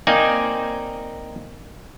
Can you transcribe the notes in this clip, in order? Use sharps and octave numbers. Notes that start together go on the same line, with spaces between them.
A#3 C4 D#4 D5 D#5 G#5